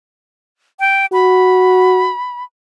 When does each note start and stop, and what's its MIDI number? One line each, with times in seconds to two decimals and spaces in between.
0.80 1.06 79
1.13 2.11 66
1.13 2.44 83